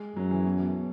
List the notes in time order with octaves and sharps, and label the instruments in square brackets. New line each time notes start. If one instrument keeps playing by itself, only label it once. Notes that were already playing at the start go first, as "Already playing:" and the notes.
Already playing: [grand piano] G#3
[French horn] F#2 [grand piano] F#3
[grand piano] E3
B2
B2